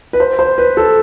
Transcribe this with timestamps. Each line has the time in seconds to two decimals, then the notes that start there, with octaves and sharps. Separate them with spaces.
0.13 B4
0.20 C5
0.39 C5
0.58 B4
0.77 A4